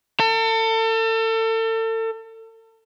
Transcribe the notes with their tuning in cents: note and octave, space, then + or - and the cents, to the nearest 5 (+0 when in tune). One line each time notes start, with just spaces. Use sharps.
A4 +35